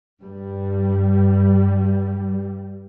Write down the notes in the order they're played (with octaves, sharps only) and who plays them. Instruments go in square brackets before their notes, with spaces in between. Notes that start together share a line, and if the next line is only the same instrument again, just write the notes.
[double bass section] G2 G3